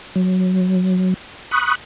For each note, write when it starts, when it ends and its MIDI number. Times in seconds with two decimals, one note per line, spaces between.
0.16 1.14 54
1.51 1.75 83
1.51 1.75 85
1.51 1.75 87
1.51 1.75 90